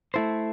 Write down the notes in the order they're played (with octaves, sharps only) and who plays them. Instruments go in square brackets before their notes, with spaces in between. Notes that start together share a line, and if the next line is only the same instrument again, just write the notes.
[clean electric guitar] A3 E4 A4 C5